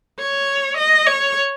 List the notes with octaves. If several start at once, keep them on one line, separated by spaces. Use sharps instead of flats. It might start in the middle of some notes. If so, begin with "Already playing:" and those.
C#5
D#5
C#5